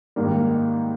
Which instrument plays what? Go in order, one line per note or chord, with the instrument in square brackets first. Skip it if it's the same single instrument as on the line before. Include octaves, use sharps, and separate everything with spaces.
[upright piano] G#2 D#3 G3 A#3